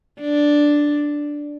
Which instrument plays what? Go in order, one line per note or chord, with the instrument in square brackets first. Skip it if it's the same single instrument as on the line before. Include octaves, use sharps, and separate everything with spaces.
[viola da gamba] D4